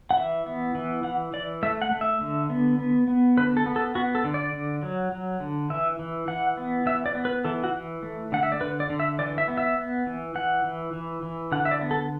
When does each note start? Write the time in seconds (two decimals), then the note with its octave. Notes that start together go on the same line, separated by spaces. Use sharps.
0.11 F#5
0.17 E3 E5
0.46 B3
0.75 E3
1.04 E3 F#5
1.33 E3 D5
1.63 A3 E5
1.82 F#5
1.91 A3
2.01 E5
2.21 D3
2.50 B3
2.79 B3
3.08 B3
3.37 D3 B4
3.57 A4
3.66 B3
3.76 A4
3.95 B3 F#4
4.15 A4
4.24 D3
4.34 D5
4.53 D3
4.83 F#3
5.12 F#3
5.40 D3
5.70 E3 E5
5.99 E3
6.28 E3 F#5
6.57 B3
6.86 E3 E5
7.06 D5
7.15 B3
7.25 B4
7.45 E3 A4
7.64 F#4
7.74 E3
8.03 A3
8.32 D3 F#5
8.43 E5
8.52 D5
8.61 D3 B4
8.80 D5
8.90 D3
9.00 E5
9.19 E3 D5
9.38 E5
9.48 B3
9.57 E5
9.78 B3
10.07 E3
10.35 E3 F#5
10.64 E3
10.93 E3
11.23 E3
11.52 D3 F#5
11.65 E5
11.71 D5
11.81 B3
11.91 A4